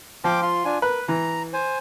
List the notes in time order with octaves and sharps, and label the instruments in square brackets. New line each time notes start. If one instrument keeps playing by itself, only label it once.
[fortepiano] F3 [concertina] G5 C6 D6
[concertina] F4 C6
D4 F4 G#5
[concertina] A#4 [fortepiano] B4
[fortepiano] E3 [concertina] A#5
[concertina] C5 G#5